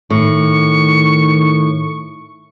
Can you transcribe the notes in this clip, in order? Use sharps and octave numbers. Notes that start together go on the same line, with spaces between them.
A2 D#3 C#6